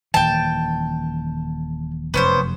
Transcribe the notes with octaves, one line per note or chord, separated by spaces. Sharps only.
D#1 E3 G5 A5
F1 F#2 B3 C#4 C5